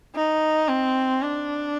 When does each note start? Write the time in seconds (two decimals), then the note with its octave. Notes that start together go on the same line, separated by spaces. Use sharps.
0.15 D#4
0.69 C4
1.22 D4